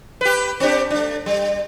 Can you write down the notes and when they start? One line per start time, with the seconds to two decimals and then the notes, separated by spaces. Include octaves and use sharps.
0.21 G4 B4
0.60 C4 D4 G4
0.90 A3 D4
1.26 G3